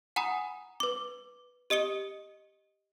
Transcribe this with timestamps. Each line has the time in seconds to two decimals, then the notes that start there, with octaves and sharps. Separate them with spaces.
0.16 F#5 G#5 A#5 B5 D#6
0.80 B4 D6
1.70 G4 D#5 D#6 C#7 G7